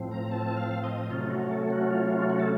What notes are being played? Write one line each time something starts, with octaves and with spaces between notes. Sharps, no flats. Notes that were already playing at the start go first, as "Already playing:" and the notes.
Already playing: A2 F3 C4
A#5
A5
F5
D#5
C3 F#3 A3 C#4 F4
F#4
A4
F#4
F4
F#4
A4